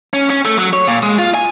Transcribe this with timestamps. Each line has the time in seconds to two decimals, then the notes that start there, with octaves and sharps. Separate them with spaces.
0.13 C#4
0.30 C#4
0.45 A3
0.59 F#3
0.73 C#5
0.87 A#2
1.03 G#3
1.19 F4
1.34 G#5